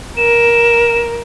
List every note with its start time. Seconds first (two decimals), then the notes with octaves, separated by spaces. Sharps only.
0.17 A#4 E7